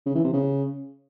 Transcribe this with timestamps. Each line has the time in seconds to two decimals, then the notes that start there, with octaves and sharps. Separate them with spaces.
0.06 C#3
0.15 E3
0.24 C3
0.33 C#3